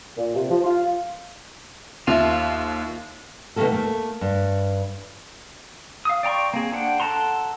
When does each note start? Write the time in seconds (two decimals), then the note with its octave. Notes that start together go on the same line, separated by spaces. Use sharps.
0.17 A#2
0.35 C3
0.50 F3
0.64 F4
2.07 D#2 F4 E5
3.56 B2 D#3 E3 A3 A#3 A4
3.72 A3 A#3
4.21 G2
6.05 F5 D#6
6.23 D5 G5 A#5 C6 C#6
6.54 A#3 C4 G#4
6.73 D4 C5 F#5 G5
7.00 A4 F#5 A5 A#5 C6